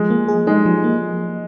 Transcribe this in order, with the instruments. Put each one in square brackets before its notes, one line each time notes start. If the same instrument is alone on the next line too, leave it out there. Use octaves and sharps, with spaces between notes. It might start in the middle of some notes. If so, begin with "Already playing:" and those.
Already playing: [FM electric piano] F3 [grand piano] G#3
[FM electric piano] A#3
G#4
[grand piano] G#3 [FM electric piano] D#4
[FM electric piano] F3
A#3